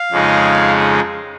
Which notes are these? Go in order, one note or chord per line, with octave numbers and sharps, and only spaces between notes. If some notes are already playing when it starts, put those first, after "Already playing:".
Already playing: F5
F2 C#3 G#3 D#4